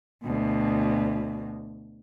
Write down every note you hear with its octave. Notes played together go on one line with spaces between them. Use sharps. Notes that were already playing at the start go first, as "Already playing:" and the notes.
D2 B2